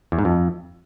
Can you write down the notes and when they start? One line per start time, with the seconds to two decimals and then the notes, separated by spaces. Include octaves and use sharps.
0.12 E2
0.19 G#2
0.25 F2